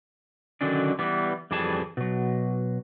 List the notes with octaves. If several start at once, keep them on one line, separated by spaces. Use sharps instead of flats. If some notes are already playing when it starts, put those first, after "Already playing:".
D3 D#3 F#3 C#4 D4
E3 G3 B3
F2 E3 G3 G#4 A5
B2 F#3